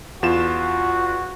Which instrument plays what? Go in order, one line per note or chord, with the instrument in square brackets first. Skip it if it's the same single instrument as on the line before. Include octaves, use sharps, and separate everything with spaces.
[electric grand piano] E2 F4 E7 [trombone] F#4